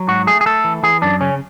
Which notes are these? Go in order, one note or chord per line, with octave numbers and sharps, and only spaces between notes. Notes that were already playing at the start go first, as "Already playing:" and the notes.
Already playing: F#3
G#2 F#4
A3 G#4
G#4
A3 A4
E3
E3 G#4
F#2 D4
C#3 C#4